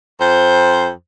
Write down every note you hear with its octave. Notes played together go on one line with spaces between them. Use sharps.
F2 C5